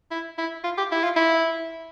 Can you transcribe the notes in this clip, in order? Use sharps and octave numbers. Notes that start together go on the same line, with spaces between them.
E4
E4
F4
G4
E4
F4
E4